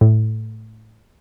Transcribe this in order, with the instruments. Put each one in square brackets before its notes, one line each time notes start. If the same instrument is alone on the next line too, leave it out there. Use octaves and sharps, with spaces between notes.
[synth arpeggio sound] A2